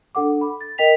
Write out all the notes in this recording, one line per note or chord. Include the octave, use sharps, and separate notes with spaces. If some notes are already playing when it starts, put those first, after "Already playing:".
D4 A4 F#5 D6
B5
A6
A#4 D#5 G5 B6 F7